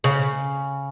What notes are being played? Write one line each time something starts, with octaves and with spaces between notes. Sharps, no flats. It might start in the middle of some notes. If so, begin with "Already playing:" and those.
C#3